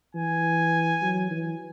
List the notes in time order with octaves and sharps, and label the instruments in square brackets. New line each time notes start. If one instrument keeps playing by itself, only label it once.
[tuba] E3 [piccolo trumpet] G#5
[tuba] F#3
E3